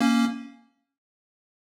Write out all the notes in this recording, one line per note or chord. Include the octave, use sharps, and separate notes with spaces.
A#3 C#4